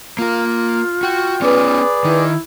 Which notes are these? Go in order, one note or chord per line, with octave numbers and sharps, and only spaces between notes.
A#3 F4 A#4
F#4 G5
B3 C#4 G#4 B4 D5
D#3 E4